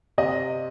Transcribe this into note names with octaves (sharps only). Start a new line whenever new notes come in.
C3 D#5